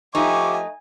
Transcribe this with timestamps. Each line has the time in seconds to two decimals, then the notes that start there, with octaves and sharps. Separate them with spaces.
0.15 F3 A3 D#4 G4 E5 G#5 C#6 D6